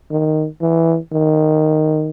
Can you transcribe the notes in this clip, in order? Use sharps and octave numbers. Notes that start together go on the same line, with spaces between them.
D#3
E3
D#3